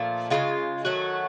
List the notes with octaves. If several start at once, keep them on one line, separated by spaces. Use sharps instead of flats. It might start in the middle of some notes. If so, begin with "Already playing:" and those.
Already playing: A#2 F3 A3
C#3 F3 G#3 F4
D#3 F#3 A3 F#4